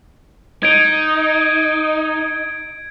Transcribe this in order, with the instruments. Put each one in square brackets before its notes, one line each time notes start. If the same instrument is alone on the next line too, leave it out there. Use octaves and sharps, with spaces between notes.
[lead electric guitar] D#4 [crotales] G#6 D7